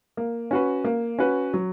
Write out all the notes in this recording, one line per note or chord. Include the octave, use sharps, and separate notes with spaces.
A#3
C#4 F#4 B4
A#3
C#4 F#4 B4
F#3